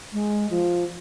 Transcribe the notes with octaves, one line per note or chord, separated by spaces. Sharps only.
G#3
F3